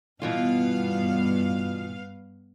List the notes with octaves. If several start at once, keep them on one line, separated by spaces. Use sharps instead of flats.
G2 B2 E3 B3 F4 F5